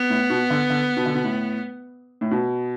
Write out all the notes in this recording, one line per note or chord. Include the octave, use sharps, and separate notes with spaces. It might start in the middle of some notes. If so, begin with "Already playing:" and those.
Already playing: B3
A2
B2
D3
D3
B2
D3
B2
A2
A2
B2